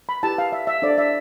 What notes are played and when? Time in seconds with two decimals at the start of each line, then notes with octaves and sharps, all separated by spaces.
0.09 B5
0.23 E4 G4 B4 A5
0.38 F5
0.52 E5
0.67 E5
0.82 D4 A4 C5 D5
0.98 E5